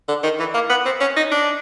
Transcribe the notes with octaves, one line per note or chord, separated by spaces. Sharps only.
D3
D#3
E3
A#3
B3
C4
C#4
D#4
D4